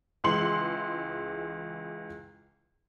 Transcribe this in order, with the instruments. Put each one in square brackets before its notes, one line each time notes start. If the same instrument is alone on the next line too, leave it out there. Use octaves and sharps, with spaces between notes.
[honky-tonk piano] C#2 E3 G#3 C6 C#7 F#7